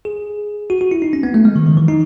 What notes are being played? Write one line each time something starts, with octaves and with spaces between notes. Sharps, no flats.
G#4
F#4
F#4
E4
D#4
C#4
B3
A3
G#3
D#3
D#3
E3
D#4